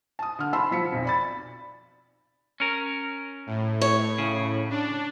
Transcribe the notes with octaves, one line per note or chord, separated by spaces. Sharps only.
A5 D#6
D3 F6
F#5 A5 B5 C6 E6
F3 B6 C#7
B1 F2
D5 B5 A6
C#4 A#4
A2
C#5
C#3
D4